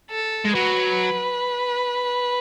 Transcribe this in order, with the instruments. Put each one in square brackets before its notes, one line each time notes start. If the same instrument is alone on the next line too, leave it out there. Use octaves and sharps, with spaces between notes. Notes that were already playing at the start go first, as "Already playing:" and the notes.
[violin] A4
[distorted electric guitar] G#3
[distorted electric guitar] F#3 [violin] B4